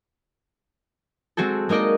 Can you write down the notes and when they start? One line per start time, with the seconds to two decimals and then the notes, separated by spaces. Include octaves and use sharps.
1.37 G#3 C4 F#4 G#4 A4
1.69 G#3 A#3 D#4 D5 D#5